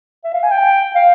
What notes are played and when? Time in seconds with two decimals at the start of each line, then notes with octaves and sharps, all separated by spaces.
0.25 E5
0.34 F5
0.43 G#5
0.51 G5
0.95 F5